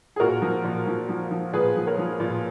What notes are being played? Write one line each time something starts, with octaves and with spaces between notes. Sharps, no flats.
G#4
A#2 F#4 A#4
F3
A#2
F3
F3
F3
A#2 G#4 B4
F3
A#4 C#5
F3
A#2